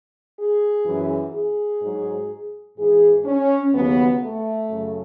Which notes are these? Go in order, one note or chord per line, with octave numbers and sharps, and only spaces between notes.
G#4
F#2 E3
G#4
G#2 F#3
G#2 E3 G#4
C#4
D#2 C#3 F#3 B3
A3
F#2 C#3 F#3